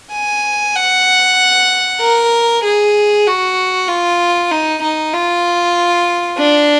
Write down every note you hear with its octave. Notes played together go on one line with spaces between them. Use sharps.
G#5
F#5
A#4
G#4
F#4
F4
D#4
D#4
F4
D4